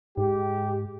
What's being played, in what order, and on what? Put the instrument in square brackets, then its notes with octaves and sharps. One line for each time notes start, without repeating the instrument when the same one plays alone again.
[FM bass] G#2 [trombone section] G#3 G4